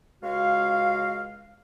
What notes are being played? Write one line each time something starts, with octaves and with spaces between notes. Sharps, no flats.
C#2 G#3 F#4 F5